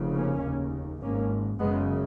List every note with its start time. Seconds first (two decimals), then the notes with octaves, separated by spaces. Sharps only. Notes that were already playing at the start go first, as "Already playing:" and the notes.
Already playing: F1 F2 C#3
0.13 A#3 C#4
0.43 F1 D#2 C#3
1.01 G#1 G#2 A#3 C#4
1.60 F#1 F#2 C#3 G#3 B3